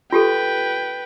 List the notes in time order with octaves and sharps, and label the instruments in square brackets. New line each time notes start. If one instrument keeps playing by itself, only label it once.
[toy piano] F4 G4 A4 [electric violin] B4 G5